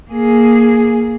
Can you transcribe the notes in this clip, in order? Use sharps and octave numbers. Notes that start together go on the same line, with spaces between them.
A#3 G#4